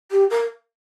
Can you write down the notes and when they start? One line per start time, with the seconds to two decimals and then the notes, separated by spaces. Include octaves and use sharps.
0.11 G4
0.30 A#4